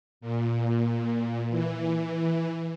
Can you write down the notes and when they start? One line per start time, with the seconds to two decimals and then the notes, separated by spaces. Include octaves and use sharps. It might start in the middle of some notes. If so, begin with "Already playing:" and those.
0.21 A#2
1.49 E3